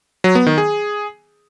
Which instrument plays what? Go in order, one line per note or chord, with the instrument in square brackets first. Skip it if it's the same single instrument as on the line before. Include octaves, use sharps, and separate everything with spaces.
[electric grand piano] F#3
B3
D#3
G#4